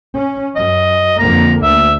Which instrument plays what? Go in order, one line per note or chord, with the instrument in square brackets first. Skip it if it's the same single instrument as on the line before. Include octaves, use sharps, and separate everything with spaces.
[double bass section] C#4
[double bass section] F#2 [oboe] D#5
[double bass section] F2 D3 A#3 [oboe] A#5
[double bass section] D2 [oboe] E5